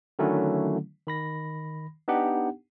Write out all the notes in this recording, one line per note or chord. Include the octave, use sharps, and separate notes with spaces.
D3 D#3 F#3 A3 C#4 E4
D#3 B5 A#6
B3 D4 D#4 G4 F#5